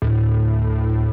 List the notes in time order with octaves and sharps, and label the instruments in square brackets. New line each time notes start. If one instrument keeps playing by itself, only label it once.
[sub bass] D2 [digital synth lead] A2